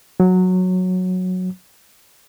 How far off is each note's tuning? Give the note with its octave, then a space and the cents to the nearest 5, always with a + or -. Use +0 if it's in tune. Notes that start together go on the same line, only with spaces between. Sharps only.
F#3 -10